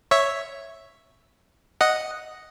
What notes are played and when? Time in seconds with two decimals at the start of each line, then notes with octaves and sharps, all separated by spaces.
0.11 C#5 E5
1.81 D#5 F#5